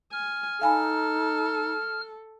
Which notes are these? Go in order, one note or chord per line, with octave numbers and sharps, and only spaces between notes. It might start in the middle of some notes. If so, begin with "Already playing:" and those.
G#5 F6
D#4 A4 F5 G#5 B5